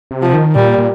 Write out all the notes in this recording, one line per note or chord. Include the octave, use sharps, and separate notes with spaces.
C3
F3
D#3
A#2 G3
A#2